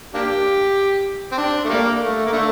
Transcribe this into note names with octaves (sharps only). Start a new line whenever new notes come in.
A#3 D4 G4
C4
D4
A3
G3 A#3
A3
A#3
D3 A3